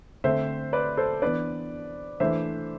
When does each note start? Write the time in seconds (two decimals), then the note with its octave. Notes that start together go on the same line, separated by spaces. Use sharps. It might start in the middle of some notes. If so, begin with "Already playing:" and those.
0.24 D3 A3 C4 C5 E5
0.73 B4 D5
0.97 A4 C5
1.22 E3 B3 D4 B4 D5
2.20 E3 A3 D4 C5 E5